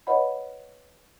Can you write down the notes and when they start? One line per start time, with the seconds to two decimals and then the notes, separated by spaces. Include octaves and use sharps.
0.07 B4 C#5 D#5 F#5 B5